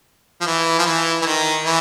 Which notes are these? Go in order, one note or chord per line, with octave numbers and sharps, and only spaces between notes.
F3
E3
F3
E3
E3
D#3
E3